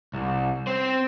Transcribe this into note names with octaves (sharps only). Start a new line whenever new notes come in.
C2
C4 C5